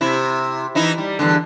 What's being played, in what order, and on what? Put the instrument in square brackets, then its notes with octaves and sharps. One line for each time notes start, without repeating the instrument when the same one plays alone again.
[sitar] C3 E4
E3 D#4 E4
G3
E2 G2 D3